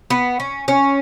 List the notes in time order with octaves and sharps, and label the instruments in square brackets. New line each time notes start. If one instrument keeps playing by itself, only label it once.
[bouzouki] B3
C#4
C#4